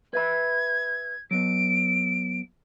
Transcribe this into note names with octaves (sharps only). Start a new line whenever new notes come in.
B4 E5 B5 G#6
F#3 B3 D7